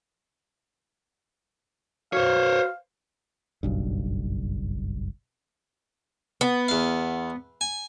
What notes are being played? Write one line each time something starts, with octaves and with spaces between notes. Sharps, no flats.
F#4 C5 C#5 F5
F#1 B1 G2
B3
E2 F5
G#5